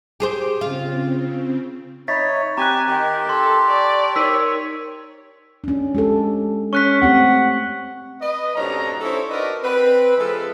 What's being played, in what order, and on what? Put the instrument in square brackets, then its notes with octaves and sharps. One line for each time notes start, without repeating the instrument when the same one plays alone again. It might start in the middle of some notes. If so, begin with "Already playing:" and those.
[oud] G4 G#4 C5
[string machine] C#3 C4 [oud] F4
[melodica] D#4 C#5 [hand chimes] E5 B5 [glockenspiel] A6 B6
[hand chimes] C4 [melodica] G4 [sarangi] G#5 [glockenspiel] A#5 F#6
[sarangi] D#3 [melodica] G4 [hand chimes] G5
[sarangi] A4 [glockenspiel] C6
[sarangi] D5 [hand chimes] A5 C#6 E6
[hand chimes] D#4 A#4 [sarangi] C#5 [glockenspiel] E6 B6 D#7
[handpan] C#4 D4
G#3 G4 A4
[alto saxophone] C#4 [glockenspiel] C#6 F#6 B6
[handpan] A3 C4 G4 [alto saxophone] F#5
[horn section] B4 D#5
F#2 A2 C3 C#4 D4 A#5
C#4 D#4 E4 A4 C5 C#5
D4 F#4 A#4 B4 D5 D#5
C4 B4
E3 G#3 F4 A4 B4